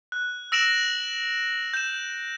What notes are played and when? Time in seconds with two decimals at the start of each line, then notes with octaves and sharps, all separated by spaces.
0.12 F#6
0.52 E6 A#6 D7 E7 F#7
1.74 G6 E7